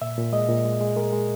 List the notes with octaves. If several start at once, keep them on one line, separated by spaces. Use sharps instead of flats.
A#2 E5
A#2
G#3 D#5
A#2
G#3
G#3
G#3 A#4
G#3